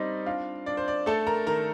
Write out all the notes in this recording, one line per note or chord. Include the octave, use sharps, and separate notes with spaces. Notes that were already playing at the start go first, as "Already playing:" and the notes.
Already playing: G3 C4 D#4 D5 D#5
D4 F4 F5
D4 D5
C5
D5
A3 A4 A5
A#4 A#5
D#3 A#4 A#5